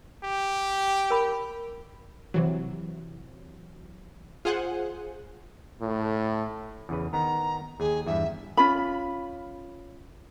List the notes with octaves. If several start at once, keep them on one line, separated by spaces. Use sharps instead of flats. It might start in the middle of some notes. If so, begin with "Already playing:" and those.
G4
A#4 B5
C3 E3 F#3
F4 G#4 C5 F#5 G#5
A2
E2 C#3 B4
D#3 B3 A#5
D#2 G#4
E2 G2 E5
C#4 F4 B5